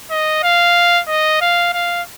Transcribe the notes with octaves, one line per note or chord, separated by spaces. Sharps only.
D#5
F5
D#5
F5
F5